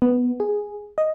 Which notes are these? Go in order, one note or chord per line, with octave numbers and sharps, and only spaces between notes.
B3
G#4
D#5